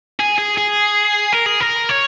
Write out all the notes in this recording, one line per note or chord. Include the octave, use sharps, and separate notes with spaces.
G#4
G#4
G#4
A#4
G#4
A#4
C#5